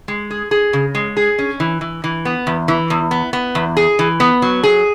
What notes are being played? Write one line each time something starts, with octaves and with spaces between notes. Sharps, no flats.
G#3
G#4
G#4
C#3
G#3
G#4
C#4
E3
E3
E3
B3
E2
E3
E2
B3
B3
E2
G#4
E3
B3
F#3
G#4